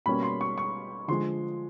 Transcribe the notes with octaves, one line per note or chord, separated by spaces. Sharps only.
B2 G3 A#3 C#4 B5
C6
C#6
C#6
D3 F3 G#3 C6